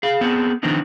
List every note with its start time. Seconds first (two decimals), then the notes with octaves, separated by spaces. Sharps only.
0.03 G#4 F5
0.21 B3 C4 G#4 A4
0.63 D#3 F3 B3 C4 D4 D#4